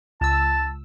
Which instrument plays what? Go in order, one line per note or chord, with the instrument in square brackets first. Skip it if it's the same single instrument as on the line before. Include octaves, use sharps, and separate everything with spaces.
[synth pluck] C#2 E6 [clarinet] A5